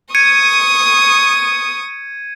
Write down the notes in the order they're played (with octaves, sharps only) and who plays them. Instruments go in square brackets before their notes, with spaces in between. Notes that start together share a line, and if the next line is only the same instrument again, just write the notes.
[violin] C#6 D#6 [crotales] G#6 C#7 D#7